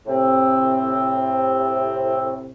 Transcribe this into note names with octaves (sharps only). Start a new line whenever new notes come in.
A2 C3 C4